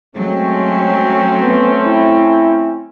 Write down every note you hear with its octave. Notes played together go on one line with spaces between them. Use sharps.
F#3 G#3 A3 C4 C#4
B3
E4